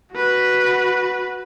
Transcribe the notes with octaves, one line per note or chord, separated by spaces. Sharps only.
F#4 B4